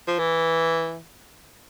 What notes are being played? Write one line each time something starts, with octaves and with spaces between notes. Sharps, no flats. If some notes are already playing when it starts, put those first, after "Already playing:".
F3
E3